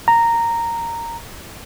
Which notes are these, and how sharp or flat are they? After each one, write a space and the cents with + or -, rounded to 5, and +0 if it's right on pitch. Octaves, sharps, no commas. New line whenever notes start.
A#5 -10